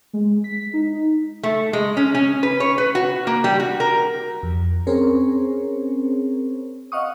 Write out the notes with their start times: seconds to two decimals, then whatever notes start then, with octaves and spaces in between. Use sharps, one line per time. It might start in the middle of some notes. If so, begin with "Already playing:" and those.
0.13 G#3
0.44 B6
0.73 D#4
1.43 A3
1.73 G#3
1.97 C#4
2.15 C#4
2.43 B4
2.60 C#5
2.78 B4
2.95 F#4
3.27 A#3
3.44 G3
3.60 F#4
3.80 A#4
4.43 F2
4.87 C4 C#4 G#4 A#4 C5 C#5
6.92 D#5 F5 F#5 C#6 D#6